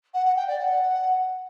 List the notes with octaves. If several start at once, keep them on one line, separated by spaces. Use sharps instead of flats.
F#5
F#5
G5
D5
F#5